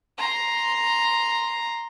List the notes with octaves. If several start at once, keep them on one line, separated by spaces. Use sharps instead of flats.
A#5 C6